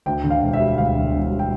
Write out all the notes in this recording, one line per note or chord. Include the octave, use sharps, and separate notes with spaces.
D2 G5
D3
F5
E1
E5
G3
D2 F5
D3
E1
G3
G5